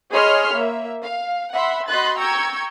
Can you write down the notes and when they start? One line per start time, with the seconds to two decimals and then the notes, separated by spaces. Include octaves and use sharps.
0.12 G#4 C#5 D#5 B5 C6 F6
0.53 A#3 E5
1.01 F5
1.52 E5 F#5 B5 C6
1.88 F#4 D#5 B5 C6 F#6 A6
2.17 G5 A#5 C#6 E6 G#6